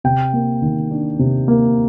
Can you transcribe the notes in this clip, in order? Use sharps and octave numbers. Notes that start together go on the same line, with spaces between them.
C3 G5
A#3
D#3
D4
C3
A#3